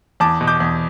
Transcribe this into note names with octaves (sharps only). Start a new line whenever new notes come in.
E2 A5 D6
B2
D6 G6
E2